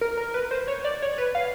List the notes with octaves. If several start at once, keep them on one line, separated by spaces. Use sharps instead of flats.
A#4
A#4
B4
C5
C#5
D5
C#5
B4
F5